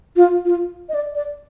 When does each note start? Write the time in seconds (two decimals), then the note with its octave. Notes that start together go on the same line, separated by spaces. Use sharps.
0.17 F4
0.45 F4
0.89 D#5
0.94 D5
1.15 D5